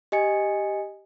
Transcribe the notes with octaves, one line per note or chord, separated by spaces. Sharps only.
G4 D#5 G#5 C#7